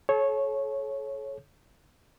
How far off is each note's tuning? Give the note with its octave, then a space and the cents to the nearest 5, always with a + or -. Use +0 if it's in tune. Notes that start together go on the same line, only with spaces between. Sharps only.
A4 -40 C#5 -15